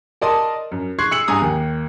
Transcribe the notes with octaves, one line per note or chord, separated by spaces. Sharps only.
A#4 D5 D#5 A5 C6 D#6
F#2
C6 C#6 F#6 G#6 C7
E6 C#7 F#7
G2 G#5 A#5 D#6
D#2